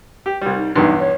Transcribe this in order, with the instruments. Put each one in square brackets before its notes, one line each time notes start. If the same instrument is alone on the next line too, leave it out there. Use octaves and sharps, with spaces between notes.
[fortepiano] G4
C2 G3
[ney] D#4
[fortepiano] B1 E2 G2 [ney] D#4
[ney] C#5